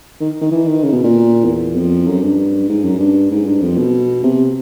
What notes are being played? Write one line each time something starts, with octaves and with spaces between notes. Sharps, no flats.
D#3
D#3
E3
D#3
C#3
B2
A#2
E2
F2
F#2
G2
G#2
F#2
G2
G#2
G2
F2
B2
C3